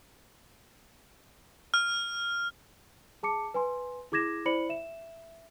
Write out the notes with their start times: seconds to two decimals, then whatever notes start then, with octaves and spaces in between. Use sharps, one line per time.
1.74 F6
3.23 G#4 A5 D6 C#7
3.54 B4 G#5 C6
4.12 E4 G#4 D6 G#6 A#6 E7
4.45 E4 C5 D5 B5 C#7 F#7
4.69 E5 E7